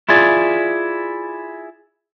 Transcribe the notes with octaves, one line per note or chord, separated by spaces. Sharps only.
E4 F4 G#4 D5